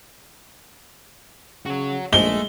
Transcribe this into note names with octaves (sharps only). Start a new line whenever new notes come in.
C#3 F#4 C#5
A#1 G#3 A3 G7